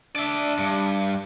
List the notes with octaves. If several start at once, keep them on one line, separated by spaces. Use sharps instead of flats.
D4 D5 E5
G2